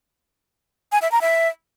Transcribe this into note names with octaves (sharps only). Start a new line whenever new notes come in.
G#5
E5
A#5
E5